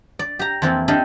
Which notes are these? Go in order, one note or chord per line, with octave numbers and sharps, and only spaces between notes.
D5
G4 A#5
F2 E3 F3 A#3 C4
D4 E4 G4 A4 D#5 F5